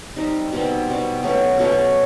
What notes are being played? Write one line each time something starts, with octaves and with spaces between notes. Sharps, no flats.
G3 C4 D#4
B2 G3 C4
B2 G3 C4
B2 F#3 A3 C#4
B2 F#3 A3 C#4